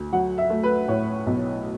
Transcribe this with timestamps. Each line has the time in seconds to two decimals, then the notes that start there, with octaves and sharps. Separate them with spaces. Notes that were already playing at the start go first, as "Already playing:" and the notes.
Already playing: D2
0.12 F#3 F#5
0.38 E5
0.50 A3
0.63 B4
0.88 A2 C#5
1.26 B1